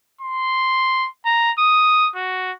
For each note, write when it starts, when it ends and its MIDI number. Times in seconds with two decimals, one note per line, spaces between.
0.21 1.08 84
1.25 1.51 82
1.59 2.08 87
2.15 2.52 66